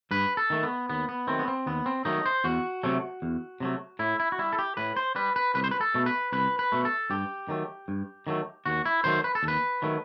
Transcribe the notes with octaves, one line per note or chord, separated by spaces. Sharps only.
G2 B4
A4
D#3 A3
B3
D#2 B3
B3
D#3 F#3 A3 C4
B3
C4
D#2 B3
C4
D#3 F#3 A3 D#4
C5
E2 F#4
C3 F#3 A3
E2
C3 F#3 A3
A2 E4
E4
F#4
G3 E4
A4
G4
A2 B4
C5
G3 B4
B4
C2 B4
C5
B4
A4
B2 A3
B4
C2 B4
B4
B2 A3
A4
G2 G4
D#3 F#3 A3
G2
D#3 F#3 A3
D#2 F#4
E4
D#3 F#3 A3 C5
B4
A4
D#2
B4
D#3 F#3 A3